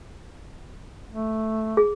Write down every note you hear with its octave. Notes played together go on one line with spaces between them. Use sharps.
A3
G#4